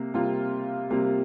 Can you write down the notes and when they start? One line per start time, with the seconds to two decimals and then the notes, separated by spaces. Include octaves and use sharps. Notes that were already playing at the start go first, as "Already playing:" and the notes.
Already playing: C3 A#3
0.14 C3 G3 A#3 F4
0.90 C3 G3 A#3